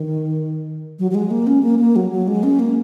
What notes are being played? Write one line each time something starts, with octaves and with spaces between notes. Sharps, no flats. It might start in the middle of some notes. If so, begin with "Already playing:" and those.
Already playing: D#3
F#3
F#3
G#3
A#3
C#4
A#3
A#3
F#3
F#3
G#3
C#4
A#3